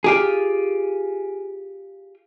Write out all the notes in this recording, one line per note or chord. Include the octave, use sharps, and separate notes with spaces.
F4 G4 G#4